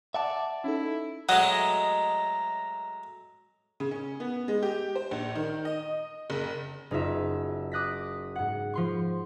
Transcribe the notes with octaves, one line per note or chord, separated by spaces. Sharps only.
D5 E5 F#5 A5
C#4 D#4 E4 A4
F#3 G#3 A3 D#5 F#5 A#5
C#3
C#4
B3
G#3
G4
C5
A#1
D#3
D#5
F#1
F#1 D#4 F4 E5
D6 D#6 F#6 A#6 B6
G#2 F#5
F3 C6 C#6